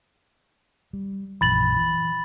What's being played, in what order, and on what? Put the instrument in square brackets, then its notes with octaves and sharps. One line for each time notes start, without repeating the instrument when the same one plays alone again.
[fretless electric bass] G3
[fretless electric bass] A#1 F#2 E3 [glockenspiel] B5 A6 F#7
[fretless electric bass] E3